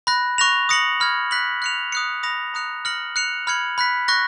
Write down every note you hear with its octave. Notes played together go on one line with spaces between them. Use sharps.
B5 F#6 A#6
C#6 F#6 A#6 F7
D#6 A#6 C#7 F#7
B5 F6 G#6
F#6 B6 F#7
F#6 C#7 F7
D#6 F#6 C#7
B5 D#6 A#6 F7
A#5 D#6 F#6 C#7 F7
F6 A#6 C#7 F#7
F#6 C#7 F7
B5 F6 G#6 C#7 F#7
B5 F#6 B6
C#6 F#6 A#6